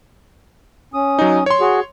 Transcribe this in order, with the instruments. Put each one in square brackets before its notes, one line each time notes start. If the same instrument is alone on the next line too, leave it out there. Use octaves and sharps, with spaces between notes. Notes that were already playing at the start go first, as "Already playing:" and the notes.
[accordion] C#4 D#6
[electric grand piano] F#3 D#4
C#5 C6
[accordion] F#4 G#4